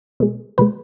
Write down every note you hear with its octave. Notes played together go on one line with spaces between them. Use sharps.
B2 G#3
B2 G#3 B4